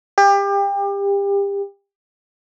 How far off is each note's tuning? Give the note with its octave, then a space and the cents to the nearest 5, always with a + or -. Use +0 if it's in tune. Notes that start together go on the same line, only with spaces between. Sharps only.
G4 +30